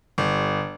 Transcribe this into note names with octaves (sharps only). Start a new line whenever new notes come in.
G1